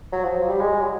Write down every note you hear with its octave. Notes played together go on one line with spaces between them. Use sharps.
F#3
F3
F#3
G3
G#3
F#3